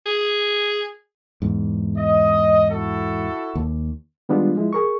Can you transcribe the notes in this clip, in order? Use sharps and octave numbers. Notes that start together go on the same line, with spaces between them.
G#4
E2 G#2
D#5
E4 F#4 A4
D#2
D#3 G3 G#3 B3 D4 F4
F3 G#3 E4
G#4 A#4 C#6